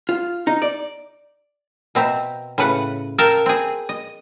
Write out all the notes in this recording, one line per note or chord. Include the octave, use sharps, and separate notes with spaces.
F4
D#4
D5
B2 C4 E5 A#5
A2 C#3 B4 F#5
A4 A#4 F5 G5 A5
C4 G#4
D#5